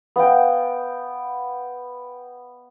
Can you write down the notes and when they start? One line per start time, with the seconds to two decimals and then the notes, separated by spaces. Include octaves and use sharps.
0.16 B3 D#5 F5 G5